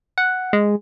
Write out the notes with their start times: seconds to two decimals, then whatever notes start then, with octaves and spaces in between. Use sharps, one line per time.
0.18 F#5
0.53 G#3